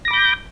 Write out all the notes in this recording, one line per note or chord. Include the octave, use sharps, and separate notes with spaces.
B5 D6 G6 A#6